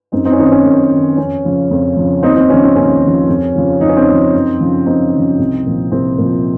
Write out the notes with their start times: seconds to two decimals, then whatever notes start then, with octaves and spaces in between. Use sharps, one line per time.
0.12 F#2 C4 D#4
0.25 C4 D#4
0.33 C#4
0.38 D#3 C4 D#4
0.48 D#4
0.52 C#4
0.65 F#2
0.92 D#3
1.17 F2 C#4
1.44 C#3 F3
1.71 F2
1.97 C#3 F3
2.23 D#2 C4 D#4
2.36 C4 D#4
2.50 C#3 F3 C#4
2.63 C4
2.76 D#2 C#4
3.02 C#3 F3
3.29 F2
3.55 C#3 F3
3.81 F2 D#4
3.89 C#4
3.97 C4 D#4
4.07 C#3 F3
4.34 F#2
4.60 C#3 F3
4.86 F#2 C4 D#4
5.13 C#3 F3
5.39 C2
5.66 A#2 F3
5.92 C2 C4
6.18 A#2 F3